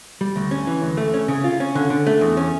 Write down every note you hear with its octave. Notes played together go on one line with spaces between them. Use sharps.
G3
D2
C#4
E3
D2
A3
C#4
C#3
F4
C#4
D3
D3
A3
E2
C#4